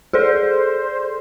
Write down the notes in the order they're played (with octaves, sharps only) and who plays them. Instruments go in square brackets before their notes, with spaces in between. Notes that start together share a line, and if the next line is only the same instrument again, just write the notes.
[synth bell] G#4 A4 D5 [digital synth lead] C5